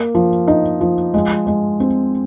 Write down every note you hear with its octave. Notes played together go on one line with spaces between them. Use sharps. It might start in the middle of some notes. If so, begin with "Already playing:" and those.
Already playing: A#3
F3
D#4
F3
G#3
G#3
C4